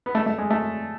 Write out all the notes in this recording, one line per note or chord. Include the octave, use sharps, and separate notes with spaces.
B3
A3
A3
G#3
A3